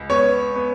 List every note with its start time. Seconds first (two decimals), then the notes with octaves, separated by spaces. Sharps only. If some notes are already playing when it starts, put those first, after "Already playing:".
Already playing: C#2
0.10 B3 C#5
0.55 B3